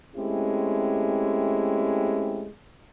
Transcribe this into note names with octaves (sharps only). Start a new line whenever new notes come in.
G#3 A3 C4 C#4 E4 G4